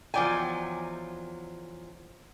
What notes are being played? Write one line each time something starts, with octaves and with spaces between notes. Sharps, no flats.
E2 F3 F#3 D5 G5 G#5